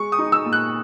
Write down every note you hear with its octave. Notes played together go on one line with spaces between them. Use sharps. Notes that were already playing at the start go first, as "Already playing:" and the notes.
Already playing: G#3 C#6
D#6
D#4
E6
A#2
F#6